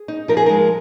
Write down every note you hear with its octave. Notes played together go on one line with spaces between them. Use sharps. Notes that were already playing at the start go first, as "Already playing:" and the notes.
Already playing: G#4
D#4
F3 A#4
G#4
G#3 A#4